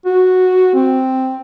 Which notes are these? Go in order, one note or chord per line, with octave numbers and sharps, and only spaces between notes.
F#4
C4